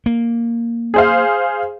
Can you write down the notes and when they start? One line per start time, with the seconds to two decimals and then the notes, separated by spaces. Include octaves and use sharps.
0.06 A#3
0.94 G#4 C5 F5